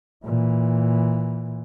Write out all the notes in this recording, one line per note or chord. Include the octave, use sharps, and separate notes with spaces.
A#2 E3